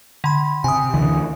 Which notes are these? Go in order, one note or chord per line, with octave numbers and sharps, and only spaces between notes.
D3 B5
C3 G#5 D#6
D2 D3 E3